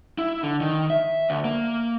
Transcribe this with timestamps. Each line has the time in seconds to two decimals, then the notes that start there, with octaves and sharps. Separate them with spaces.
0.18 E4
0.43 D3
0.61 D#3
0.90 E5
1.30 D2
1.45 A#3